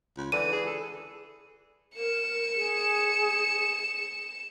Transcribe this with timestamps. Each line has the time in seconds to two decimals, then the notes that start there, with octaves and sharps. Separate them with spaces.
0.18 C#2
0.32 D3 E3 D#7
0.52 G#4
0.67 A4
1.96 A#4 C#7 E7
2.55 G#4